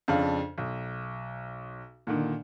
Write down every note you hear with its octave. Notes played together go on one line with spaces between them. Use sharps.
F2 C#3 D4 F5
B1
A#2 D3 D#3